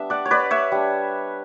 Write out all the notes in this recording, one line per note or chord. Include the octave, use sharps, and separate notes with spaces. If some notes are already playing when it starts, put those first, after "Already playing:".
Already playing: G3 B3 D4 E5
D5 F#5
C#5
B4 D5
C#5 E5
G3 D4